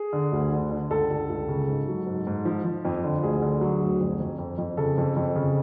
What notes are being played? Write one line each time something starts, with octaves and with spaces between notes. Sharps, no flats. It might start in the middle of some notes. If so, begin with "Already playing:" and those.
Already playing: G#4
D3
D2
D3
D3
C#2 A4
C#2
C#2
C#3
G#2
F#3
G#2
G#2
F3
F3
F2
D3
D2 G#4
D3
F#3
D2
F2
F2
F2
F2
C#3 A4
F2
F2
C#3